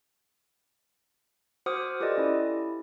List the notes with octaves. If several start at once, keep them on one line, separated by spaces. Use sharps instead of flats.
F#4 C5 F#5 D6 D#6 F6
F4 G4 A4 B4 D5 D#5
C#4 E4